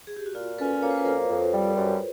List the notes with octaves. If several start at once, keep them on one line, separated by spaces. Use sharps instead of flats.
G#4
G4
F#4
A#2 F4
C#4 A4 B4
A#3 C#5
C5
B4
F2 A#4 C5
F2
G3
F#2